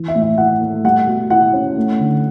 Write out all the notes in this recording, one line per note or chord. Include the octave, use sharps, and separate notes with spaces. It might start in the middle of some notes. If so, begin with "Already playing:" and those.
Already playing: E3
E5
A2
E5
E4 F#5
A3
G3 F#5
B2
E4 F#5
C#4
A3
D3